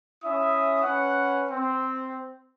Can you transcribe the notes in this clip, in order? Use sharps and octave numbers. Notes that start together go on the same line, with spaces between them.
C#4 E4 E5 D#6
C#4 B4 F#5
C4